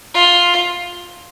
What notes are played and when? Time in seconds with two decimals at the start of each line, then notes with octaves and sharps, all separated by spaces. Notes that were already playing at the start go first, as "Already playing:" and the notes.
0.14 F4